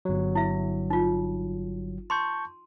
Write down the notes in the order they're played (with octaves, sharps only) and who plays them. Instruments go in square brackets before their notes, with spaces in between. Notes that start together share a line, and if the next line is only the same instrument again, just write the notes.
[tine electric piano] G1 F#3
[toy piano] E4 E5
D#4 F4
[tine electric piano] A5 C#6 G6 [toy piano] C6